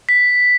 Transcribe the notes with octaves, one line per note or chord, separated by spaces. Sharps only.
B6